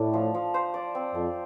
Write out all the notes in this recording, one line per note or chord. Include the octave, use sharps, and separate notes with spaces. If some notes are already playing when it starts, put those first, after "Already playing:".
Already playing: A2 D4
F3
F3
C5
D5
C4
F2 F3